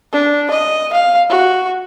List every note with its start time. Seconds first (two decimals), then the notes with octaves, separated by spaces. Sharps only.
0.13 D4
0.51 D#5
0.93 F5
1.30 F#4